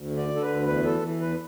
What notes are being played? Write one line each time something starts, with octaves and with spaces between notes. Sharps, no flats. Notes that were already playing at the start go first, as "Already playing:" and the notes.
Already playing: D2
D3
D5
D3
A4
B4
D2
E2 B4
E3 A4
E3
E2 B4